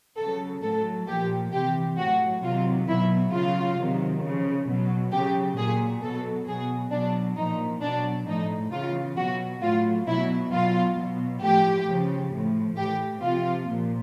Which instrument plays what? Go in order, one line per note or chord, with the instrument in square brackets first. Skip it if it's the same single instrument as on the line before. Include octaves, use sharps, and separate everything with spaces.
[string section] C#3 F#3 A4
A2 F#3 A4
A#2 F3 G4
C3 E3 G4
A2 F#3 F#4
C3 D#3 F#3 F4
B2 F#3 E4
C#3 F#3 F4
C3 D#3 F#3
C#3 F3
B2 F#3
C#3 F#3 G4
A#2 F#3 G#4
B2 F#3 A4
B2 F#3 G#4
B2 F#3 D4
A#2 F3 D#4
B2 F#3 D4
A2 F3 D#4
C#3 E3 F4
B2 F#3 F#4
A2 F#3 F4
B2 F#3 E4
B2 F#3 F4
B2 F#3
A2 F3 G4
C#3 F3
A2 F3
A2 E3 G4
C3 F3 F4
A#2 F3